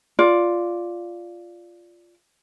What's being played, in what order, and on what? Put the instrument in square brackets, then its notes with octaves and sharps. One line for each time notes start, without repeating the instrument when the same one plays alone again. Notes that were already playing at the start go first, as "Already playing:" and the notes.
[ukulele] F4 D5